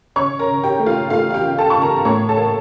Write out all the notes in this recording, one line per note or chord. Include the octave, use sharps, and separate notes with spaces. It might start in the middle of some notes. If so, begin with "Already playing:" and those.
C#3 C#5 C#6
A#4 A#5
C#3
G4 G5
A3
F4 F5
A3 F4 F5
F5
G4 G5
C#3
A4 A5
C#3 C#6
A#4 A#5
A#5
A2 C#5 C#6
A4 A5
A#3